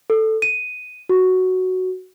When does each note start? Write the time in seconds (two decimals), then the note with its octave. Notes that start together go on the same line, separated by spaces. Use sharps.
0.10 A4
0.42 D#7
1.09 F#4